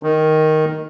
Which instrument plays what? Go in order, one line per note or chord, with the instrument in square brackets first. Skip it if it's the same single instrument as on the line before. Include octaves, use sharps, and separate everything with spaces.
[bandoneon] D#3